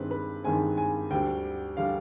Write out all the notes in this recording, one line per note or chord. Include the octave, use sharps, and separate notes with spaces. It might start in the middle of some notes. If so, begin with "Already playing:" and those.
Already playing: G2 D#3 G#3 C4 B4
B4
G2 D#3 G#3 C4 G#5
G#5
D2 D3 G3 G5
D3 G3 F5